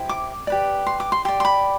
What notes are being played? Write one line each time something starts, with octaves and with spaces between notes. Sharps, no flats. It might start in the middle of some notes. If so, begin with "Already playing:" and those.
Already playing: E4 G4 C5
D6
G4 B4 D5
C6
D6
C6
G4 D5 C6
C6
B5